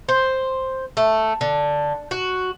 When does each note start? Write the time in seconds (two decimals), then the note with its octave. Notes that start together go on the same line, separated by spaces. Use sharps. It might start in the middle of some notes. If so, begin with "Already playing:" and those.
0.09 C5
0.97 A3
1.41 D3
2.11 F#4